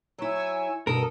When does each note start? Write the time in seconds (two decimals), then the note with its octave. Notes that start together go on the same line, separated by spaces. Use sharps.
0.18 F#3 E4 G#5 C#6 E6
0.87 G2 B2 A4 A#4 D#6